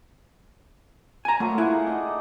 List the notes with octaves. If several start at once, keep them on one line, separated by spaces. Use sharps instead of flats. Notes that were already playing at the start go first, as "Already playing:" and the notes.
G#5 A#5
F#3 A3 A#3 F4
A3 E4 G#4 F#5
D#4 D5 D#5